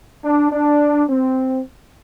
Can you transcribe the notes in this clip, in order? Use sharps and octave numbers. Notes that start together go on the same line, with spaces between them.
D4
D4
C4